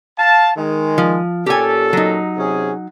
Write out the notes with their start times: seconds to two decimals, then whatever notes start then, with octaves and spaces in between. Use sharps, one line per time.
0.19 F5 A5
0.57 D#3 G#3
0.98 F3
1.46 A#2 C#4 G4 A4 G#5
1.93 F#3 D#4
2.37 C3 C#4 G#4